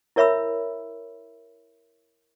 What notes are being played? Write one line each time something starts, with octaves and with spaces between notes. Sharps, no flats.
E4 A#4 C#5 E5 B5 E6